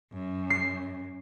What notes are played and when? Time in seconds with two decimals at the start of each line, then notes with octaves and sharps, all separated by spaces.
0.13 F#2
0.50 C7